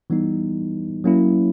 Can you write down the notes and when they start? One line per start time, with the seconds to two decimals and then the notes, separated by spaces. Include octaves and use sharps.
0.10 E3 G3 B3 D#4
1.04 F#3 A#3 C#4 E4